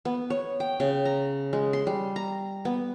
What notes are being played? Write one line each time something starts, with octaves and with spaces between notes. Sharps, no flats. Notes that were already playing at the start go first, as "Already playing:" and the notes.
B3
C#5
G5
C#3
A#5
G#3
C6
G3
A#5
B3